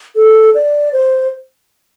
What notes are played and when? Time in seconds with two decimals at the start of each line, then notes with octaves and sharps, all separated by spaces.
0.16 A4
0.55 D5
0.93 C5